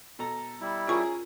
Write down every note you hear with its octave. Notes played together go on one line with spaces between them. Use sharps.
B2 A4 A#5
G3 E4
C#4 F4 G#4 A#4 C#6